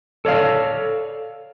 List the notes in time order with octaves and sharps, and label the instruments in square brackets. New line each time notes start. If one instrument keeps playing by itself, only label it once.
[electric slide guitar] A4 C#5 D5 F5